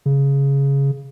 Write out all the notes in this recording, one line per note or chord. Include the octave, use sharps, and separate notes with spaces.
C#3